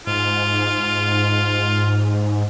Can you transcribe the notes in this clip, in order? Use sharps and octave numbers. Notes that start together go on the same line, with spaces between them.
G#2 F4